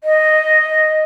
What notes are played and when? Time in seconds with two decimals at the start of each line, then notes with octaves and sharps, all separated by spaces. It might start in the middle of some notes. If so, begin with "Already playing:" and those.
0.04 D#5